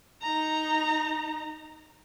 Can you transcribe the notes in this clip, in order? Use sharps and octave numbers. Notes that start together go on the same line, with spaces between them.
D#4 A#5